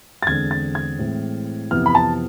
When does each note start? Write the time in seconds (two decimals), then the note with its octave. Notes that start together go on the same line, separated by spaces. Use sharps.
0.23 A6
0.27 E2 D3 G#3 C4 G#6
0.51 A6
0.75 G#6
0.99 A2 E3 G#3 C4
1.71 F2 C3 E3 B3 F6
1.86 B5
1.95 A5